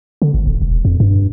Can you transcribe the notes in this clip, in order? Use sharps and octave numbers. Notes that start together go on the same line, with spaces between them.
D3
G1
D1
E1
F2
G2